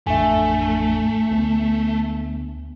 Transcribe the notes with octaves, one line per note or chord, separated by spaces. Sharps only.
A1 F2 A3 D4 E5 G#5
D2 B3